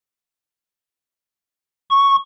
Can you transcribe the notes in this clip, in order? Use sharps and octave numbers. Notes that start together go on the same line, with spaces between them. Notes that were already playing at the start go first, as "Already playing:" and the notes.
C#6